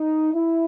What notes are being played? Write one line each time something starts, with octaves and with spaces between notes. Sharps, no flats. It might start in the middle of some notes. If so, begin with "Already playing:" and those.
Already playing: D#4
E4